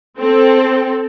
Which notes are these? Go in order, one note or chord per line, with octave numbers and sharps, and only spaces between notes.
C4 A4